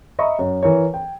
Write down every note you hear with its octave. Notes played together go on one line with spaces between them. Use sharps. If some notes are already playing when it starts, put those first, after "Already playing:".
D#5 E5 A#5 B5 C#6
F#2
E3 A#4 C#5
G5